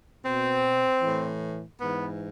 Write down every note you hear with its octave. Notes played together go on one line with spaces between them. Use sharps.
B2 C4
A2 E3
G#2 E3 B3